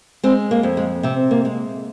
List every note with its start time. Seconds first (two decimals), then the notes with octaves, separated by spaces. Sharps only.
0.23 G#3 C4
0.51 A#3
0.63 F2
0.77 G#3
1.03 C3 C4
1.31 A#3
1.45 G#3